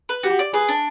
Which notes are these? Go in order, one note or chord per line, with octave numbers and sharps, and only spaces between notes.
B4
F#4 G4
D5
G#4 B4
D4